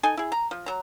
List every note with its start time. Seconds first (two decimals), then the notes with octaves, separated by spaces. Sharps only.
0.03 D#4 A4 G#5
0.17 E4 G#4
0.32 A#5
0.51 F3
0.66 F#3 A#5